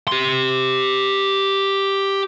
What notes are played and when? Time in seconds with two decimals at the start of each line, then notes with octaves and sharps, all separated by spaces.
0.08 G4 C6